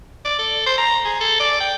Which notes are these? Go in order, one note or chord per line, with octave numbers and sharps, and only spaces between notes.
D5
A4
C5
A#5
G#4
A4
D5
G5